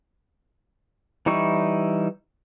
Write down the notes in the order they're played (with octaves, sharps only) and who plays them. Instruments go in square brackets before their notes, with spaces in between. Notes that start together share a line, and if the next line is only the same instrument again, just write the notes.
[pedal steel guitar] E3 G3 D#4 E4 C#6